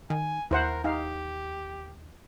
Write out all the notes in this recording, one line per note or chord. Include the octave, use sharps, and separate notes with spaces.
D#3 G#5
D#2 E4 A#4 C5 F#5
D#4 G4 F5